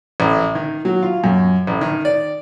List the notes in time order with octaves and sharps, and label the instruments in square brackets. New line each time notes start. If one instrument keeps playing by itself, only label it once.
[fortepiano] A1
D#3
F#3
F4
F#2
A1
D#3
D5